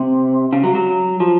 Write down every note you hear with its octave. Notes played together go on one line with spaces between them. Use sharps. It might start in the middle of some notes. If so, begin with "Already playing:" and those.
Already playing: C3
C#3
F#3
F#3
F3